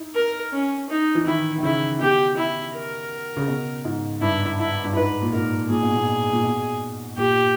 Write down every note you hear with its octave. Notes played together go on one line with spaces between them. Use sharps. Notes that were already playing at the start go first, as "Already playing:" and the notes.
Already playing: D#4 E4
A#4
C#4
D#4
E3
D#3 E4
D#3
C#3 E4
B2 G4
E4
A#4
C#3
B2
G#2
G2 E4
E4
G2
G#2 B4
A#2
G#2 A#4
A#2 G#4
B2
A#2
A#2
B2
A#2 G4